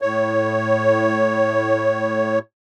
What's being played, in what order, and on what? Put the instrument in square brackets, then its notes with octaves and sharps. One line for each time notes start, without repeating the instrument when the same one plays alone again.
[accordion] A2 C#5